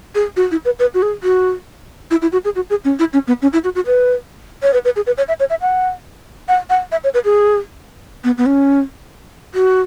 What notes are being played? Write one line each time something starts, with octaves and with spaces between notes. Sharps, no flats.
G#4
F#4
E4
B4
B4
F#4
G#4
F#4
E4
E4
F#4
G#4
F#4
G#4
C#4
E4
C#4
B3
C#4
E4
F#4
F#4
B4
C#5
B4
B4
G#4
B4
C#5
E5
C#5
E5
F#5
F#5
F#5
E5
C#5
B4
G#4
B3
B3
C#4
F#4